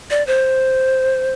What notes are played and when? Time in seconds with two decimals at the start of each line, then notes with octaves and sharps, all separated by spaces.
0.10 D5
0.27 C5